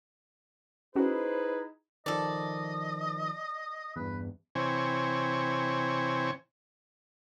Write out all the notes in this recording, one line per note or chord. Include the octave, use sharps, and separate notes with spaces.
C#4 D#4 E4 F#4 G#4 B4 C5
D#3 F3 A4 D5 D#5
E2 G2 B4
C3 E3 C4 C#5 G#5